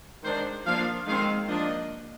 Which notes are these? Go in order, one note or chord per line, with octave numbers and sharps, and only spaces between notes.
D#3 G#3 D4 C5
F3 A#3 D4 F5
D#3 G#3 C4 F5
F3 A#3 D4 D#5